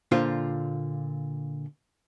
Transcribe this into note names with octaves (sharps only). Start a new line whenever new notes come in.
A#2 D3 F4 C5